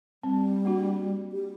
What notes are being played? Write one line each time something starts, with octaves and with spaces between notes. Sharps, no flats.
G3 C4
A#3 D4 F#4
G4